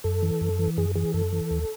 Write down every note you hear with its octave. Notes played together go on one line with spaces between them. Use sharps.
F#2 A4
E3
F#2
E3
F#2 G#4
E3 G#4
F#2 A4
E3
D#2